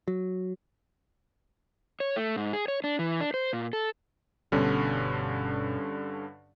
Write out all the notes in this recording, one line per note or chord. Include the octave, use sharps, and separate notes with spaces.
F#3
C#5
A3
G#2
G#4
C#5
D4
E3
D4
C5
A#2
A4
G1 G2 B2 D3 C#4